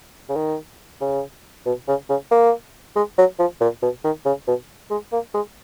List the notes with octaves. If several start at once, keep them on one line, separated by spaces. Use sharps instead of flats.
C#3
D#3
C#3
B2
C#3
C#3
A#3
G#3
F#3
F3
A#2
B2
D#3
C#3
B2
G#3
A#3
G#3